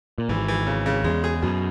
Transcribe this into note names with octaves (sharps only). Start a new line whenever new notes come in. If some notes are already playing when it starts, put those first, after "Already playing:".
A#2
G#1 G#2 E3
E3
C#3
C#3
E2 G#3
G#4
F#2 B2